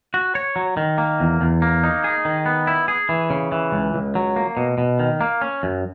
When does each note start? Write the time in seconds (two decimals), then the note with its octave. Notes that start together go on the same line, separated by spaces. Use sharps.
0.14 F#4
0.35 C#5
0.56 F#3
0.77 D#3
0.98 A#3
1.20 E2
1.41 E2
1.62 A#3
1.84 D#4
2.04 G#4
2.25 D#3
2.46 B3
2.67 E4
2.88 G#4
3.09 E3
3.30 C#3
3.52 E3
3.72 C#2
3.94 C#2
4.15 F#3
4.36 A#3
4.57 B2
4.78 B2
4.99 D#3
5.21 A#3
5.41 C#4
5.63 F#2